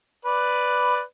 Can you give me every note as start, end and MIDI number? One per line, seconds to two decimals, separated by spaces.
0.25 1.01 71
0.25 1.01 74